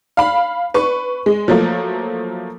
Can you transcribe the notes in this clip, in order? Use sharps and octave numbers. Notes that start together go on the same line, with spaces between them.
F5 B5
B4 C#6
G#3
F3 F#3 A3 A#3